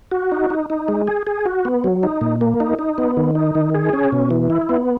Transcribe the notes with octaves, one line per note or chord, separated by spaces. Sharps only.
F#4
D#4
D#4
D#4
G#3
G#4
G#4
F#4
B3
F#3
D#4
A#2
A#3
D#4
D#4
B3
D#3
D#4
D#3
G#4
C#4
B2
E3
E4
B3